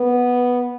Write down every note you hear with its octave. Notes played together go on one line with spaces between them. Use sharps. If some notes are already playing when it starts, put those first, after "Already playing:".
Already playing: B3